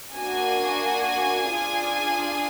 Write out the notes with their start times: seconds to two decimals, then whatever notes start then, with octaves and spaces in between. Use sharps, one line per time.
0.12 A#3 D4 F#4 G#5
1.48 D4 F4 G#4